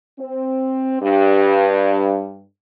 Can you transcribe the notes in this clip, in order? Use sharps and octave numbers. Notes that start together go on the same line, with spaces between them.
C4
G2